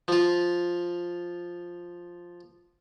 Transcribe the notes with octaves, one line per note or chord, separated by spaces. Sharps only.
F3 F4